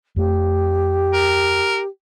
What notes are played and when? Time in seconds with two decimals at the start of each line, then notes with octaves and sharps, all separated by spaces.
0.16 F2 A3 G4
1.14 A#4